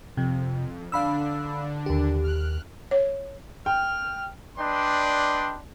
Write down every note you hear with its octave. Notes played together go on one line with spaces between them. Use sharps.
F2 C3
D3 D4 F5 B5 E6
D#2 G4
F6 F#6
C#5
G5 F6
D4 B4 D5 D#5 G5 C6